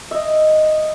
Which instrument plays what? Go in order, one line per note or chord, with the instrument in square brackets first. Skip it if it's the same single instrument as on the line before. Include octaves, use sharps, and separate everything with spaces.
[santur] D#5 E5